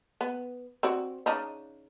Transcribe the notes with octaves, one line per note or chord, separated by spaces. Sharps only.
B3
C4 F#4 D5
C#3 D4 D#4